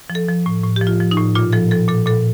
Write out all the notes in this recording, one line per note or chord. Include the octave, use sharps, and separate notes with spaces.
F3
A4
F3
A2
A2
G4
F3
F4
F3
D#4
A2
A#2 F4
F3 A4
F3 A4
A#2 A4
A#2 A4